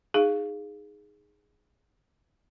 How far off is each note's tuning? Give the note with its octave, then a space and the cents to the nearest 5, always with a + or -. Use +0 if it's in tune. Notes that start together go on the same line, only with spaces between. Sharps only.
D#4 +0 G#4 +0 F5 +0